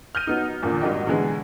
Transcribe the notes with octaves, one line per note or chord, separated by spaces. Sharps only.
F6 G6 A#6 D#7
F#3 B3 D#4
E2 A#2 D3 D#3 F3
G#1 G3 D4 F#4 D#5 G5
B2 D3 E3 F#3 G#3 B3